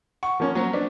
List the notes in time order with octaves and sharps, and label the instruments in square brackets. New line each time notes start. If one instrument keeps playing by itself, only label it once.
[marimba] F#5 [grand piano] C#6
[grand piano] F3 A#3 C#4
[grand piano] F#3 [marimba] A#3 C5
[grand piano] D4 [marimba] B4